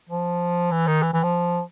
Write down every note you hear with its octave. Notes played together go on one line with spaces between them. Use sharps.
F3
E3
D#3
E3
E3
F3